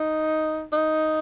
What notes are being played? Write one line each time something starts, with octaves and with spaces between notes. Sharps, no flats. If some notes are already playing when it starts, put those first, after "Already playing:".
Already playing: D#4
D#4